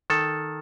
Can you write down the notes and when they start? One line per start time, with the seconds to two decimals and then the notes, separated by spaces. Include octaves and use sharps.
0.10 D#3 A4